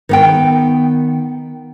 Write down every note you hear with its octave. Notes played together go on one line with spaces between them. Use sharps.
D#3 B3 G5